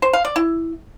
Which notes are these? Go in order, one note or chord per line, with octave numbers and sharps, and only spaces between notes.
C5
F5
D5
E4